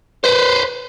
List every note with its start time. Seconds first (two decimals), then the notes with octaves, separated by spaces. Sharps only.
0.24 B4 C5